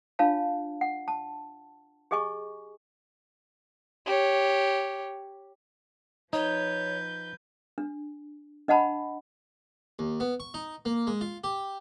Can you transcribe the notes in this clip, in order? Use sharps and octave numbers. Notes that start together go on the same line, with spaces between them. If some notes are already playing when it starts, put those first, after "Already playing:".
D4 F4 C#5 F5 A5
F#5
A5
G4 G#4 D#5 G#5 C#6
G4 C#5
F3 D#4 B4 C#5 G6
D4
D4 D#5 F#5 A5 B5
D#2
B3
C#6
D#4
A#3
G#3
F4
G4